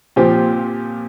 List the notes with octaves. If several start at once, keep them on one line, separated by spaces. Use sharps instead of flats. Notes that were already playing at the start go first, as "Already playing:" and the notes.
A#2 F3 C4 G4